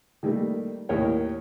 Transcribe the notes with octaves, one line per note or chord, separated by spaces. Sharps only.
D#3 G3 A3 A#3
D#2 A2 A#4 C#5 G5